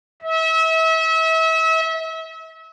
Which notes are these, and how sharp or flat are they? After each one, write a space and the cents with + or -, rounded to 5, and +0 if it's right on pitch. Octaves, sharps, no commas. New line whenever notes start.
E5 -35